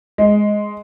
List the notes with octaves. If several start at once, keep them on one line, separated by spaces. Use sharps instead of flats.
G#3